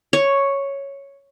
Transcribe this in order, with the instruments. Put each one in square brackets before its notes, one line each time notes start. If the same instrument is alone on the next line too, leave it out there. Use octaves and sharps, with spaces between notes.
[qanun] C#5